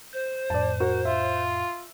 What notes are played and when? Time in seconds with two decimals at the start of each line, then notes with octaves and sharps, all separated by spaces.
0.13 C5 G6
0.50 F2 A2 D5 A5
0.80 F#4 A#4
1.05 F4 E5